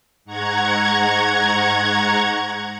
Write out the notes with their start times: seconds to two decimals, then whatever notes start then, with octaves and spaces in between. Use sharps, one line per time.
0.25 G#2 F#5 A#5 C#6 G#6